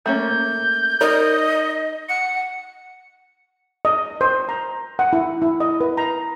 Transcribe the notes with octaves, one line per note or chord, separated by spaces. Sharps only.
A3 A#3 C#4 G6
D#4 A#4 D5 D#5
F#5 C#7
D#5
C5
A#5
F#5
E4
E4
D#5
B4
A#5